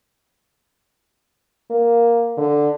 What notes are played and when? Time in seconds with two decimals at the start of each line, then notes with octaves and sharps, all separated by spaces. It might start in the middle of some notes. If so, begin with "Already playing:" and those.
1.70 A#3
2.37 D3